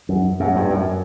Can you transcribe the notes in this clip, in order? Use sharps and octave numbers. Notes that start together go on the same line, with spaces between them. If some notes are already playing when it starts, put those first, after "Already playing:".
F#2
F#2
G2
F#2